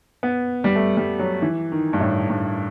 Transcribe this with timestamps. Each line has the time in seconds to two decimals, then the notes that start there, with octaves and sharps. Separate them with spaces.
0.23 B3
0.64 G3
0.75 A3
0.97 G3
1.19 F#3
1.42 E3
1.72 D#3
1.93 G2
2.00 A2
2.30 G2